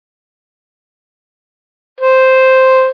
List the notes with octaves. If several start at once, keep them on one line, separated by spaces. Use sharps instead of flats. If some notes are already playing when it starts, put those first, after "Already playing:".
C5